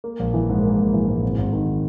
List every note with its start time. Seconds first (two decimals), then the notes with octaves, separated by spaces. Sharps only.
0.04 A#3
0.19 A#1
0.34 E3
0.49 G#2
0.63 A#3
0.78 A#1
0.93 E3
1.08 G#2
1.22 G#1
1.38 G#1
1.53 D#3